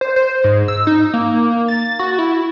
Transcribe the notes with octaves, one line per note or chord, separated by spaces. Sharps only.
C5
C5
G#2
E6
D#4
A#3
A6
F#4
E4